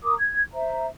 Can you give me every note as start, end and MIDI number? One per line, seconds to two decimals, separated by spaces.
0.03 0.14 70
0.03 0.14 82
0.03 0.14 86
0.03 0.14 87
0.20 0.41 92
0.52 0.86 72
0.52 0.86 76
0.52 0.86 82